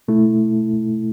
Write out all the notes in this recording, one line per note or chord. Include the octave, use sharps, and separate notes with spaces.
B2 A3 E4